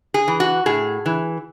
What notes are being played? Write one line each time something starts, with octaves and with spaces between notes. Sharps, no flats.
G#4
E3
F#4
A2 G#4
E3